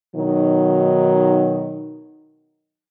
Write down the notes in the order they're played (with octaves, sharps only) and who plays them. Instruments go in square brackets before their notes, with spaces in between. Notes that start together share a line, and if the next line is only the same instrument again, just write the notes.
[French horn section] B2 D#3 F#3 D#4